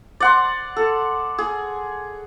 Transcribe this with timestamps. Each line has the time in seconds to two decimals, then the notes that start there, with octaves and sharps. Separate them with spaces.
0.20 D5 F#5 C6
0.76 A4
1.38 G#4